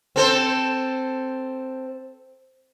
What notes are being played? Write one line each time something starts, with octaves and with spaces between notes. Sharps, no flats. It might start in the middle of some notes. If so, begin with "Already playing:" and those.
C4 A4 C5